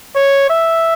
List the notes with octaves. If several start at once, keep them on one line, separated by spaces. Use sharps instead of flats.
C#5
E5